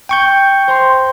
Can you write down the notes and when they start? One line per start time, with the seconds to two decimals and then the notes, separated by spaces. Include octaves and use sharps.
0.09 G5 C#6 G6
0.68 C5 A#5 C6